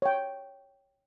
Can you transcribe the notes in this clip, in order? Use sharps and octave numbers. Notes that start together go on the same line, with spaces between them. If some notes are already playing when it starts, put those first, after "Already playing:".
C#5 G5